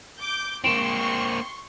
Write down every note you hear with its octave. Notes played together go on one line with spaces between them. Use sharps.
D6 G6
A#3 C4 C6 C#6 D7 E7